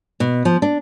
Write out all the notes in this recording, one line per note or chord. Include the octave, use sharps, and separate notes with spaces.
B2
F3
D4